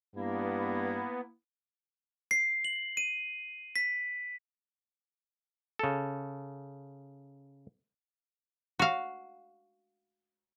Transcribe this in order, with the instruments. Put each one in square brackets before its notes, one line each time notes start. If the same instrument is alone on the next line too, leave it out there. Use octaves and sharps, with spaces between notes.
[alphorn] G2 [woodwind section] A#3 E4 [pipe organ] B3
[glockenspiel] C7
F#7
D#7
B6
[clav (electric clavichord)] C#3 A4
[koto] F#4 F5